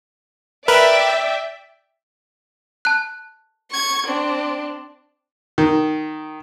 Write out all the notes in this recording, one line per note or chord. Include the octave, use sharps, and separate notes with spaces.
A#4 B4 D5 E5 G5 B5
A5 F#6
C#6 G#6
C4 D4
D#3